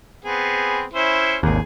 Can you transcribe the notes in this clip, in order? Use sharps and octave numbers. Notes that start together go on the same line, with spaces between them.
B3 C4 G#4
C#4 E4 C5
G#1 D#2 G#4